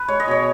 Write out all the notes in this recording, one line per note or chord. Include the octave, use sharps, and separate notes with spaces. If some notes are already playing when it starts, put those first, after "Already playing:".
Already playing: B4
G#3 C#5
D#5
B2 C#5